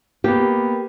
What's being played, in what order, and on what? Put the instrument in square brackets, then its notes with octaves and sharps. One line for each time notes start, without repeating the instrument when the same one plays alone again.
[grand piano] A#3 B3 [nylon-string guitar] G4